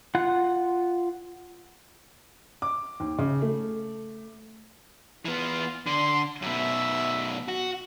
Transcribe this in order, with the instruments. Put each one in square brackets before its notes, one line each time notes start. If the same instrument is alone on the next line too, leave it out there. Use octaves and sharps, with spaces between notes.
[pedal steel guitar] F4 F#5 F#6
[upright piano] D6
D#2
C#3
A3
[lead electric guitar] E3 B3 [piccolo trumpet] F4
[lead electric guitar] D3 [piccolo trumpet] C6
[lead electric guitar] F#2 B2 [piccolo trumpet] E5
[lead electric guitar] F#4